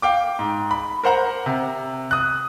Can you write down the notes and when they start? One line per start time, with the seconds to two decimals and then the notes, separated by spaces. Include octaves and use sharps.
0.02 F5 G5 D6
0.39 G#2
0.71 B5
1.04 A#4 C5 F#5 A#5
1.46 C3
2.11 D#6 F#6